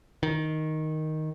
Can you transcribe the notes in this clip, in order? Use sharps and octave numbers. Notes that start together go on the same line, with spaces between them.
D#3